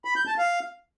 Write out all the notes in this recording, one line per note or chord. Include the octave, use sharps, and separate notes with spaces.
B5
G6
A5
F5